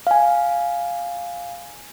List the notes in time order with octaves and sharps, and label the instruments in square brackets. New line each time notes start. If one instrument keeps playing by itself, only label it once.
[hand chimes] F5 G#5